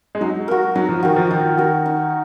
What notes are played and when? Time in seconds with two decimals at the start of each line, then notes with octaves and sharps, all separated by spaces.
0.15 G#3
0.21 F#3 D#4
0.48 F#4 A#4
0.75 F#3 D#4
0.89 F3
1.03 D#3 F#4 A#4
1.16 F3
1.31 D#3 D#4
1.57 F#4 A#4
1.86 D#4